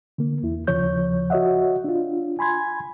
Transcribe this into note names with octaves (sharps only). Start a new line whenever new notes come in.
D3 A#3
E2 E4
D#2 C#3 F3 C#5 G6
F#4 C#5 D#5 E5 F#5
D4 F4
G#5 B5 C6 G#6